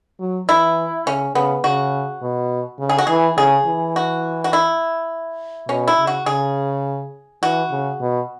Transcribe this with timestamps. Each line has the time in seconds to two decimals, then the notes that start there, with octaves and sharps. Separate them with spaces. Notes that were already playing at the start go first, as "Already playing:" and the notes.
0.20 F#3
0.48 E3 E4
1.06 C#3 C#4
1.35 C#3 B3
1.64 C#3 F#4
2.22 B2
2.79 C#3
2.89 G#4
2.99 F#4
3.07 E3 G#4
3.37 C#3 G#4
3.66 E3
3.96 F#4
4.44 F#4
4.53 E4
5.69 B2 C#4
5.88 E4
5.97 C#3
6.07 F#4
6.26 C#3 G#4
7.43 E3 F#4
7.71 C#3
8.01 B2